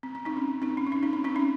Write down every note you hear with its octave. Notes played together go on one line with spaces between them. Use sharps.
C4
C4
C4 D#4
C#4
C4
C4 D#4
C#4
D#4
C#4
C4 D#4
C#4
C4 D#4
C#4